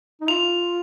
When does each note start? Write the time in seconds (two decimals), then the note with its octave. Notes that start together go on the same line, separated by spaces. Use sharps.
0.21 D#4
0.28 F4 F7